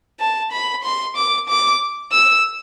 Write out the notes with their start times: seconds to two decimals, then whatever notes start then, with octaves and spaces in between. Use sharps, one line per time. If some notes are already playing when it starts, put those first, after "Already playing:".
0.20 A5
0.52 B5
0.83 C6
1.16 D6
1.48 D6
2.12 E6